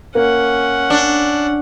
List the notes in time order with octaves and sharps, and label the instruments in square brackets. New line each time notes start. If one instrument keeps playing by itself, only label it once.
[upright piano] A#3 [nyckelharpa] C#4 F#5
[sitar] D4